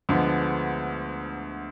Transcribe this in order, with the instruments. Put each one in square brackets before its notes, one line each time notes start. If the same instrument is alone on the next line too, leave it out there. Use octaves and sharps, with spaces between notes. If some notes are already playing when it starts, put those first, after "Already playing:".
[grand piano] D2 D3 F3 G#3 B3